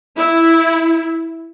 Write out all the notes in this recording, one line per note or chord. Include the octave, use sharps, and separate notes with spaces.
E4